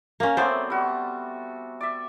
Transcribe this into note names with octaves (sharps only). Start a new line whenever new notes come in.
A#3 C#4
F#3 A3 B3 C4 C5 D5
G3 F#4
D5 E5